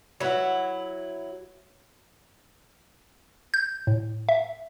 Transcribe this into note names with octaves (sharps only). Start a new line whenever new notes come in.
F#3 E4 F#4 B4 C#5
G6
A2
E5